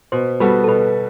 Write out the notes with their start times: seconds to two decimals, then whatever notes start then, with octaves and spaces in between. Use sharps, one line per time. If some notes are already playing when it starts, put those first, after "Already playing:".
0.12 B2 C5
0.40 G3 B3 F#4 A4 B4
0.64 A4
0.68 B2 B4